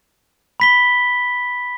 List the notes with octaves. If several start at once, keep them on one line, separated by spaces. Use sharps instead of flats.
B5 B6 G7